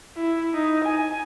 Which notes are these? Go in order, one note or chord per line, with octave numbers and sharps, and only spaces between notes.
E4
D#4
G#5